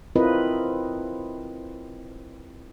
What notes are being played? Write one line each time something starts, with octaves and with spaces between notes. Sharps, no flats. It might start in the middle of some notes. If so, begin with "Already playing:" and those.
C4 E4 F4 A#4 B4 D#5